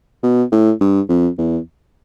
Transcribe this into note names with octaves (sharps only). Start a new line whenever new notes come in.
B2
A2
G2
F2
E2